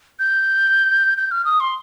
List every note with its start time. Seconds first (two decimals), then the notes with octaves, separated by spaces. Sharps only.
0.19 G6
1.18 G6
1.31 F6
1.45 D#6
1.60 C6